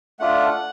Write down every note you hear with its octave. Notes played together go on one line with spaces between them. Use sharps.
A3 D4 F4 F#5